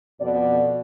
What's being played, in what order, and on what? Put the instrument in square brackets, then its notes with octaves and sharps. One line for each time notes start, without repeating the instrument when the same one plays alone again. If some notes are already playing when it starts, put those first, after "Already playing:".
[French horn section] F2 B2 D5